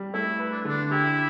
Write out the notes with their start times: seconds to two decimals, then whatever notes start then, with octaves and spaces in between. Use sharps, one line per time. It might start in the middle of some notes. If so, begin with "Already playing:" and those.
Already playing: G3
0.14 A3 E4
0.40 B4
0.52 D4
0.65 D3 D4
0.91 E4 G4